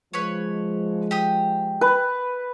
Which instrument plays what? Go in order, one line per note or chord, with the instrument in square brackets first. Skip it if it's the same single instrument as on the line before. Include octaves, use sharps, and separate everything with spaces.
[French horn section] F3 G#3 [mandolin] B4 C#5
[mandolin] G4 D#6
[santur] B4